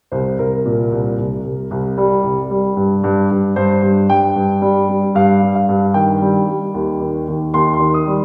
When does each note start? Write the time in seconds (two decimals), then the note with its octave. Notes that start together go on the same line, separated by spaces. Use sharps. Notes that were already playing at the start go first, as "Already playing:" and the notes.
0.12 C2 C5
0.39 C2 A#4
0.66 A#2
0.92 C2
1.18 C2
1.44 C2
1.71 C2
1.98 G3
2.24 C2
2.51 G3
2.76 G2
3.04 G2
3.31 G2
3.56 G2 C5
3.82 G2
4.10 G2 G5
4.36 G2
4.62 G3
4.89 G3
5.15 G2 F5
5.42 G2
5.55 F5
5.68 G2
5.94 D#3 G5
6.22 G3
6.48 G3
6.74 D#2
7.01 D#3
7.28 D#2
7.54 D#2 C6
7.74 C6
7.80 D#3
7.94 D#6
8.07 G3